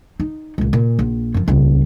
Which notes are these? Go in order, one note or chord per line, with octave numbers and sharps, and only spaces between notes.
D#4
C#2 A#2
A#2
A#1
F#2 F3
D#1 C#2